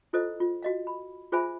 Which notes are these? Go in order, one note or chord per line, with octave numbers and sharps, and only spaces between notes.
E4 F4 A4 C5 D#5
F4
F#4 D#5 F5
B5
F4 G#4 C5 E5 G#5 B5